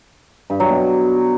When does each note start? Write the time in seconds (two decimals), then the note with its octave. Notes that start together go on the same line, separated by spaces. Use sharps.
0.50 G2
0.60 F#3
0.70 B2